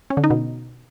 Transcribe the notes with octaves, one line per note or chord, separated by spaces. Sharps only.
C#4
D3
D#4
B2